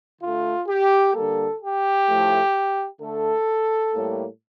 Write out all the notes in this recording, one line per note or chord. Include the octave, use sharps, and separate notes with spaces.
D3 A3 F4
G4
D3 G3 A#3 A4
G4
A2 F3 A3
D3 A3 A4
A2 G3 A#3